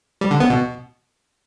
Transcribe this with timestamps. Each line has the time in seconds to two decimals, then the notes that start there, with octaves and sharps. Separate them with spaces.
0.21 G3
0.31 D3
0.40 B3
0.50 B2